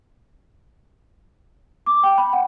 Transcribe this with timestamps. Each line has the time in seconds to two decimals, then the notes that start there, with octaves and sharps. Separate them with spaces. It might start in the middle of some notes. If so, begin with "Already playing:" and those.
1.86 D6
2.03 G5
2.18 B5
2.33 F#5